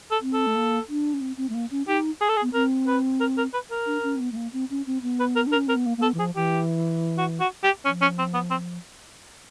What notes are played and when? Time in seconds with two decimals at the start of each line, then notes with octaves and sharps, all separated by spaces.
0.11 A4
0.21 C4
0.33 A4
0.47 A3
0.55 A#3
0.89 D4
1.13 C#4
1.21 C4
1.37 C4
1.49 A3
1.54 A#3
1.71 C#4
1.87 D#4 G4
2.21 G#4
2.29 A4
2.36 G#4
2.42 B3
2.53 C4 A#4
2.87 B4
3.20 A#4
3.37 A#4
3.54 B4
3.71 A#4
3.86 D4
4.03 C#4
4.16 C4
4.20 B3
4.32 A3
4.36 A#3
4.53 C4
4.70 C#4
4.86 C4
5.02 B3
5.20 B4
5.36 A#4
5.47 D4
5.52 A#4
5.56 C#4
5.67 C4 A#4
5.76 B3
5.86 A#3
5.97 A#3
6.02 B3 A4
6.14 E3
6.19 F3 G#4
6.35 E3 G4
7.18 F#4
7.40 F#4
7.63 G4
7.85 F3 C#4
8.01 C#4
8.18 C4
8.34 B3
8.50 C4